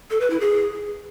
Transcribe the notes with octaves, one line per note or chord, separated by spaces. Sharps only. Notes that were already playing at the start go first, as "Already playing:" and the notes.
A4
B4
E4
G#4